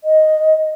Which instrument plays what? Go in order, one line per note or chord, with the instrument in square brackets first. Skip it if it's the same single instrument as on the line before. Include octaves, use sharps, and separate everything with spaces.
[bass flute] D#5